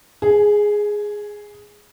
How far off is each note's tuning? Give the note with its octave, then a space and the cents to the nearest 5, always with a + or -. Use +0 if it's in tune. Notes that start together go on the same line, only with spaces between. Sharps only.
G#4 +0 G#5 +30